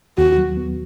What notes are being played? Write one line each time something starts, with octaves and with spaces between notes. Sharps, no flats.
D#2 F#4
F#3
B3